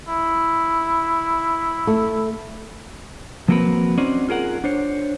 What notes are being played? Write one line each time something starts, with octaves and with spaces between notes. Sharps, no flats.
E4
A3
F3 A#3 C4 F#4 A#4 B4
C4 C#4 D#4 F#4 C5 D5
F4 G#4 A#4 F#5
D4 C5 C#5